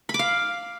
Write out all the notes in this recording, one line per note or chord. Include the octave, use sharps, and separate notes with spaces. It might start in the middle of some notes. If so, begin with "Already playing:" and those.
B5
D6
F5